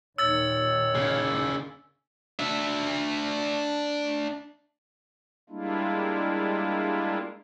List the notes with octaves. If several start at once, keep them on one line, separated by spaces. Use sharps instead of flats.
D#2 A#2 D#3 C#5 E6 A6
C#3 A#3
D4 E5
G3 G#3 A#3 D4 E4 F4